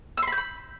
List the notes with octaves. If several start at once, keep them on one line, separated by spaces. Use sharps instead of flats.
E6
C6
B5
G6
B5